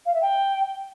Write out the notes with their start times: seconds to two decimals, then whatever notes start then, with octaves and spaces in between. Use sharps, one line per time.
0.06 F5
0.14 E5
0.22 G5